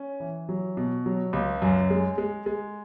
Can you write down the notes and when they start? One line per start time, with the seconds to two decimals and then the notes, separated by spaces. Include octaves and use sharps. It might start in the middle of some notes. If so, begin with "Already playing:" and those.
Already playing: C#4
0.20 E3
0.49 F#3
0.77 B2
1.06 F#3
1.33 C#2
1.62 F#2
1.90 G#3
2.18 G#3
2.46 G#3